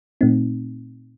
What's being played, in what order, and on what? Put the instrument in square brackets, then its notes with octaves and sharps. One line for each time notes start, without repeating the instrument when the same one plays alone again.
[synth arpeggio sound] A#2 A3 C4 D#4